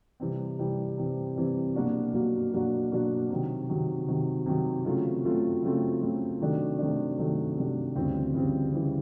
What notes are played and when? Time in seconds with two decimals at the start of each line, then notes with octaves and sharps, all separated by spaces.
0.20 C3 E3 G3 C4
0.58 C3 E3 G3 C4
0.97 C3 E3 G3 C4
1.36 C3 E3 G3 C4
1.75 B2 F#3 A#3 D4 F#4
2.13 B2 F#3 A#3 D4 F#4
2.53 B2 F#3 A#3 D4 F#4
2.92 B2 F#3 A#3 D4 F#4
3.30 C3 D#3 F#3
3.69 C3 D#3 F#3
4.07 C3 D#3 F#3
4.46 C3 D#3 F#3
4.85 C#3 F#3 A3 C4 F4
5.24 C#3 F#3 A3 C4 F4
5.62 C#3 F#3 A3 C4 F4
6.02 C#3 F#3 A3 C4 F4
6.40 C3 D#3 F#3 A3 D4
6.79 C3 D#3 F#3 A3 D4
7.18 C3 D#3 F#3 A3 D4
7.57 C3 D#3 F#3 A3 D4
7.95 D2 C#3 E3 G3 C4
8.34 D2 C#3 E3 G3 C4
8.72 C#3 E3 G3 C4